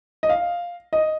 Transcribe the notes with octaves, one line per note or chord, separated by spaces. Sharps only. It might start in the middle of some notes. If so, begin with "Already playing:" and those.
D#5
F5
D#5